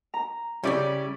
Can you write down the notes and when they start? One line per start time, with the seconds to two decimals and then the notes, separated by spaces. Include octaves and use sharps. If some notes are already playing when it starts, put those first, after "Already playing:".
0.14 A#5
0.64 C#3 G3 C#4 E4 D5